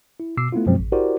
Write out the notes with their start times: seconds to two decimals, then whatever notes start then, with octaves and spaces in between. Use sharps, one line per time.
0.20 E4
0.37 B2 D6 E6 C7
0.52 A3 B3 E4 F4
0.67 F#2 B2 F3 F#3 G#3 C4
0.79 A1
0.92 E4 F#4 G4 A#4 C5 D5